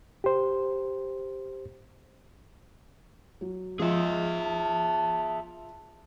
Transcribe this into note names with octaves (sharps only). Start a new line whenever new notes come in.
G4 C5
F#3
F3 G#3 G#4 E5
A5